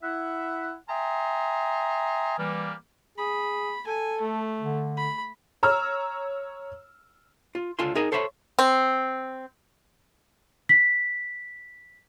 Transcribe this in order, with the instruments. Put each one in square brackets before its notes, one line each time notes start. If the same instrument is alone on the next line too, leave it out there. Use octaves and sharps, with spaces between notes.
[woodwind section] E4 E5 F#5
E5 G5 G#5 A#5 C6 D#6
E3 G3 A#3
[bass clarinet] G#4 [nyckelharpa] B5
[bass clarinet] A4 [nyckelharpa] G#5
[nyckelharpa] A3
[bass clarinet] D3
[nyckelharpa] B5
[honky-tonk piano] C#5 A#5 E6 F6
[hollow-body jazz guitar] F4
C#2 D3 F4 A4 G#5 C6
D#4 G#4 A#4 D#5 G#5
A4 C5 C#5 E5 B5
[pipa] C4
[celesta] B6